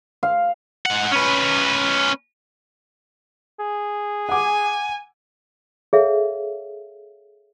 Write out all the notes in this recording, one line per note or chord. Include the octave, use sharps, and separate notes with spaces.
F5
G#2 F#5
C#4 B4
G#4
F#5 G#5 D6
G#4 A4 C#5 E5 F5